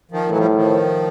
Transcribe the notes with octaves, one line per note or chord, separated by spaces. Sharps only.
D#3 F3
A2 E3 F#3
F3 G3
D#3 F3